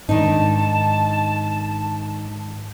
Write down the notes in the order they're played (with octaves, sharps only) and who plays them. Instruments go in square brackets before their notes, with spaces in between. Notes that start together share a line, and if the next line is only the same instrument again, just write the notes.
[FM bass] G#2 [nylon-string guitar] D#3 D4 D#4 [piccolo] A5